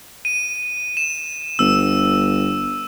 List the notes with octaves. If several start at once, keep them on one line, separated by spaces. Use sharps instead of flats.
D#7
E7
G1 E6